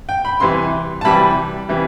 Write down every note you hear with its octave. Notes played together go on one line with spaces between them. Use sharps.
G5
B5
C3 E3 G3 C6
A5
C3 E3 G3 B5
C3 E3 G3